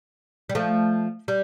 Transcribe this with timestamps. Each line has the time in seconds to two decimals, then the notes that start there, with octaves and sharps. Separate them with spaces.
0.49 G3
0.55 F3 A3
1.28 G3